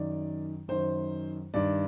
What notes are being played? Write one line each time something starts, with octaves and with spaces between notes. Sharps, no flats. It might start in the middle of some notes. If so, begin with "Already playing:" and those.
Already playing: F#2 D#3 D5
F#2 D#3 C5
G2 D#3 D5